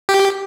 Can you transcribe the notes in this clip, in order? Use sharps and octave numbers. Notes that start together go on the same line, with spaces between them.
G4